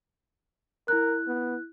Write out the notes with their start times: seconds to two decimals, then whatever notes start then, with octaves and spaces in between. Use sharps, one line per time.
0.88 E4 A#4 F#6
1.27 B3